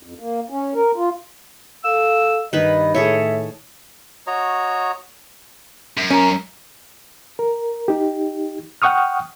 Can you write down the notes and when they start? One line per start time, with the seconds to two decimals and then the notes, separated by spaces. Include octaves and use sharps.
0.03 F2
0.19 A#3
0.50 C#4
0.75 A#4
0.96 F4
1.84 A4 F5 E6
2.53 G2 D#3 B4 D#5 B5
2.94 A2 G#4 A4 C#5 E5
4.27 F#4 C#5 D#5 A#5
5.98 F#2
6.11 C#4 A#4 A#5
7.39 A#4
7.88 D#4 G4
8.82 F#5 G5 C#6 D#6 F6